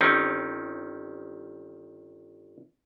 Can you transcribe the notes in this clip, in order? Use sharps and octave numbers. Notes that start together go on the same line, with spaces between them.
G1 D#3 C4 C#4 D#4